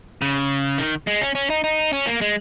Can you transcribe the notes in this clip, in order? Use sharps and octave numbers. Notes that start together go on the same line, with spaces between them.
C#3
D#3
G#3
C#4
C#4
D#4
D#4
C#4
A#3
G#3